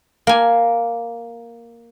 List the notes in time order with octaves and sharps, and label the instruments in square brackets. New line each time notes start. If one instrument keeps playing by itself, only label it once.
[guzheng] A#3 G#5